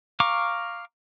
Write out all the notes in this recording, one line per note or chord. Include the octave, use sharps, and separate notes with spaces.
F5 A#5 C#6 D6